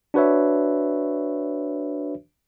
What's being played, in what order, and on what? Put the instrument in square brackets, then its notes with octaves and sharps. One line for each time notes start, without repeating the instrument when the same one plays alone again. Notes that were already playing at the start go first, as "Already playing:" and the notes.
[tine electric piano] D4 F#4 B4 C#5 E5